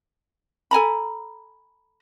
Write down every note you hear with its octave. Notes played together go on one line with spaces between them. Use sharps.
A4 G#5 A#5 B5